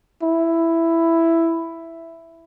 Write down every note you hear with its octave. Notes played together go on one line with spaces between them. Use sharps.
E4